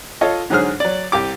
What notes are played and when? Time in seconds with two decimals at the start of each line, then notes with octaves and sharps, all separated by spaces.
0.21 F4 A4 C#5 D#5
0.50 G#2 D3 F#3 G#4 C5 F6
0.80 F#3 D5
1.12 C2 G4 D6